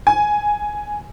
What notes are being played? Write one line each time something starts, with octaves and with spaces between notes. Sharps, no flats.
G#5